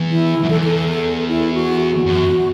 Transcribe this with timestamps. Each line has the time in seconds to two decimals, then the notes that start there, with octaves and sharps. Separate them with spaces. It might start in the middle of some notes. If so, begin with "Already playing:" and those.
Already playing: E2
0.11 E4
0.44 F#2
0.49 E2 A4
0.64 A4
0.89 A4
1.28 E4
1.54 F#4
1.81 F#4
2.06 F#2 F#4